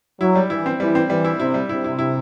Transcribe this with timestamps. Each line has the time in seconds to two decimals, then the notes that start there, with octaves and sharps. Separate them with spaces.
0.20 F#3 E4
0.35 G3
0.50 E3 E4
0.66 C4
0.80 E3 G3
0.95 C4
1.10 E3 G3
1.25 E4
1.40 C3 E4
1.54 G3
1.69 C3 E4
1.84 E4
1.99 E4